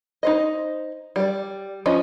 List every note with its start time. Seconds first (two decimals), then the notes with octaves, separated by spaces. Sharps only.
0.23 D#4 C5 D#5
1.16 G3 D5
1.86 F3 C#4 D#5